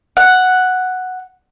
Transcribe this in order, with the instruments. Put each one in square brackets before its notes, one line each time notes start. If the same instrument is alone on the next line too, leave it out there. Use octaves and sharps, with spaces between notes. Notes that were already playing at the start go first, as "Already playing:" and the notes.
[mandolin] F#5